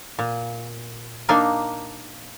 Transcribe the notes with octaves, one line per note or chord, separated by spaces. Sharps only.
A#2
A#3 D4 D#4 A#4 F5